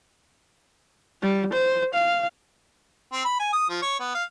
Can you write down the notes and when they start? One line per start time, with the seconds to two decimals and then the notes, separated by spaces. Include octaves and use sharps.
1.22 G3
1.53 C5
1.94 F5
3.13 C4
3.25 B5
3.40 G#5
3.53 D#6
3.69 F3
3.82 C#5
4.00 B3
4.15 F5